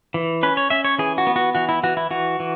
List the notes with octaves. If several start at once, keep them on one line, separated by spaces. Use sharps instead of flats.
E3
C#4 B4
C#5
C#4 E5
C#5
E3 G#4
F#4
B3
F#4
E3 F#4
E4
E3 F#4
E4
E3 F#4
E3